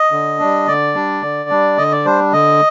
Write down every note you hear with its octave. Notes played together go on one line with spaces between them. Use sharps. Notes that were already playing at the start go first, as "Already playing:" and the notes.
Already playing: D#5
D3
G3 D4
D3 D5
G3 D4
D3
G3 D4
D3 D#5
D5
G3 D4 C5
D3 D#5